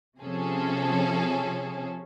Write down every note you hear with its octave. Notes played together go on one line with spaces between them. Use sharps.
C3 F3 C#4 G#4 A4